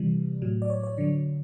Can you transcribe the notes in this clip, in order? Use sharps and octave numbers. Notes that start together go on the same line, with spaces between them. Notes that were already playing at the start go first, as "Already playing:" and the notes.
Already playing: C3 E3 G3
A2 F#3
D5
C#5
C#5
D3 F#3